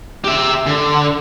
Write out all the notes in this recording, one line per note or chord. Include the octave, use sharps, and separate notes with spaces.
G4 E5
D3